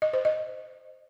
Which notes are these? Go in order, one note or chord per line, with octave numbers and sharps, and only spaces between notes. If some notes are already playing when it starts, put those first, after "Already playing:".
D#5
C5
D#5